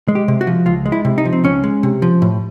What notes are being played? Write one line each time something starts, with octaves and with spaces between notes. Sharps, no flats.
G#3
G4
C3
F#4
F3
C#2 F4
G#3
E4
C3
D#4
F3
C4
C#2 C#4
G#3
C3
F3
A2